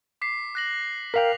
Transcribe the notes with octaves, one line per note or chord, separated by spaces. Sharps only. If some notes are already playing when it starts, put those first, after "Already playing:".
D6 B6 C7
F#6 A#6 F#7
A#4 F5 G5 B6 F7